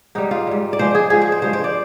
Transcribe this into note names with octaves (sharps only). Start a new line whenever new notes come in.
G#2 G3 D#4
F4
G#2 G3
D5
G#2 F3 G#3 C5
G#4
G#2 F3 G#3 G#4
C5
C5
G2 F3 G#3 C5
C5
D5